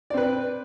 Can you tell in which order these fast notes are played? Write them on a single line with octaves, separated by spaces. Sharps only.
D5 C4 B4